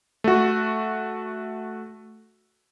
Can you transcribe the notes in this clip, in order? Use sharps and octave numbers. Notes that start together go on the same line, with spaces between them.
A3 F#4